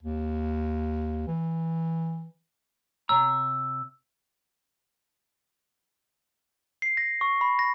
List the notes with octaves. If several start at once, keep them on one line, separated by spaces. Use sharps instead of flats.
D#2
E3
C3 C#5 A#5 E6
C7
A#6
C#6
B5
A#6